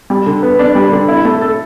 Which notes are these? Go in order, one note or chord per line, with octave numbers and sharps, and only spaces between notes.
G3
D3
B3
D4
G3
D3
E4
A3
A4